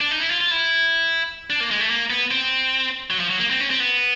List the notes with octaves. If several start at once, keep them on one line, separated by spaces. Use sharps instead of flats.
D4
D#4
E4
F4
F4
E4
D4
A#3
G#3
A3
A#3
B3
C4
F#3
F3
F#3
A#3
C4
C#4
C4
B3